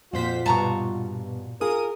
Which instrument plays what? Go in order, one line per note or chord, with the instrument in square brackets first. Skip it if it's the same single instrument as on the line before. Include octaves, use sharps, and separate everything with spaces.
[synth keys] F2 C5 B6 [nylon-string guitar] A#2 F#4 [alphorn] F4
[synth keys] G2 B2 [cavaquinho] A5 A#5 C#6
[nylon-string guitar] F4 G#4 [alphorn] A#4 [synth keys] D#6